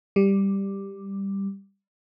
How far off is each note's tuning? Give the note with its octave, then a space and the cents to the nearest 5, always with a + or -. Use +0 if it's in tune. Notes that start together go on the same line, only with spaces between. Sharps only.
G3 +5